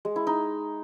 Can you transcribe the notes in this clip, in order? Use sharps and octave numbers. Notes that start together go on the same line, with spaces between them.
G#3
E4
D#4